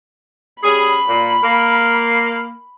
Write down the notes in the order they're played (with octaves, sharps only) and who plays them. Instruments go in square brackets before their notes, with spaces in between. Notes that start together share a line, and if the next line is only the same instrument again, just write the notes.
[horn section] G3 C#4 G#4 [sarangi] B5
[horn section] A#2
A#3